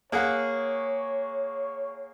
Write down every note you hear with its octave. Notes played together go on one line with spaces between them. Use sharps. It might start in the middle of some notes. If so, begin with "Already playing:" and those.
A#3 G#4 C#5 F#5